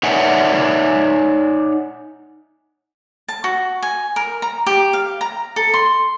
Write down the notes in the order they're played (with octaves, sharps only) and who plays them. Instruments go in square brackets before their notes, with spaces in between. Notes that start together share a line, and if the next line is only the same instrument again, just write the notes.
[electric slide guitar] D#4 C#5 D5 E5 F#5 G#5
[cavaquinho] A5
F#4
G#5
A#4
A#5
G4
F5
A#5
A4
C6